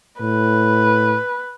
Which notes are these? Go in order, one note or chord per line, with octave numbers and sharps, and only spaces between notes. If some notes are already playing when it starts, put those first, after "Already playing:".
A2 B4